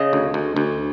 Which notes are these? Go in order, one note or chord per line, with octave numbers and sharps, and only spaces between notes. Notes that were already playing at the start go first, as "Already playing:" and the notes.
Already playing: C#3 D#5
D2
D2
D2